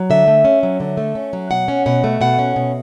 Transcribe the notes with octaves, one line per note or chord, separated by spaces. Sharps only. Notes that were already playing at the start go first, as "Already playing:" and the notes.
Already playing: F#3
D3 E5
A3
C#4
F#3
D3
A3
C#4
F#3
B2 F#5
C#4
B2 F#5
A3
B2 F#5
C#4
B2